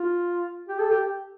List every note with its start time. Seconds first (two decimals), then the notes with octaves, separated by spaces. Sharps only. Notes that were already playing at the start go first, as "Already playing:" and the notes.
Already playing: F4
0.69 G4
0.79 A4
0.91 G4